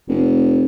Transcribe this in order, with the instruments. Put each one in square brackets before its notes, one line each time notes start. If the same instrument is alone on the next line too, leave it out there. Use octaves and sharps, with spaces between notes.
[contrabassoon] F1